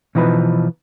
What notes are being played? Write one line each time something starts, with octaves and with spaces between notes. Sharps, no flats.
B2 E3 F3 D#4 B4